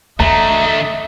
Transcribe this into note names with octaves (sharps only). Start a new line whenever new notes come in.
E2 D3 A3 D#5 E5 A#5